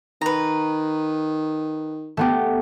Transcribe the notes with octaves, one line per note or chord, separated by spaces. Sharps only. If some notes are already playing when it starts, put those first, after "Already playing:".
D#3 B4 A#5
A3 B3 G4